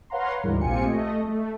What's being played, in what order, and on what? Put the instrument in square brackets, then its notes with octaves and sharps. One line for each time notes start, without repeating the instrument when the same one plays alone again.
[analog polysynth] B4 C#5 F5 F#5 A#5 C6
D2 G#2 E3 G3 A#4
A#1 C4 F4 G4 G#5 C#7
A3 D#5
A3